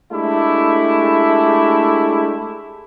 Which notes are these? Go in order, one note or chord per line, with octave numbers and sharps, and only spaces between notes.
G#3 A3 D4 E4 G4